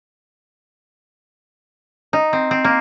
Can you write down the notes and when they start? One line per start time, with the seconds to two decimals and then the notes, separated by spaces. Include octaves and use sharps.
2.13 D#4
2.33 C4
2.51 C4
2.64 A#3